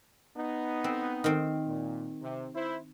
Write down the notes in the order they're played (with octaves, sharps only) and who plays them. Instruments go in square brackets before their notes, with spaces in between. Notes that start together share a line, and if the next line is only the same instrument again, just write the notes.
[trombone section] B3 D#4
[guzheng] C4
D#3 C4
[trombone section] A#2
C3
E4 C5